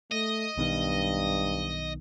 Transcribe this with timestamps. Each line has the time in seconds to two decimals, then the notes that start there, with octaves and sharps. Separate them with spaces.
0.12 A3 D#5
0.57 B1 G2 B2 D#3